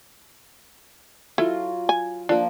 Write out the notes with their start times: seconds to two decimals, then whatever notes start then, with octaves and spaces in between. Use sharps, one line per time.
1.38 F#3 E4 F4 A4
1.89 G#5
2.29 F3 A#3 D4